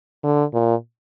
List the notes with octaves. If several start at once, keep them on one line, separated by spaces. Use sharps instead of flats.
D3
A#2